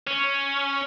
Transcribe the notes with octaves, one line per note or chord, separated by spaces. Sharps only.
C#4